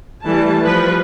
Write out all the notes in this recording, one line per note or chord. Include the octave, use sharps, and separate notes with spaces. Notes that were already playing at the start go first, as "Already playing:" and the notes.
E3 G3 A3 A5
F3 G3 B4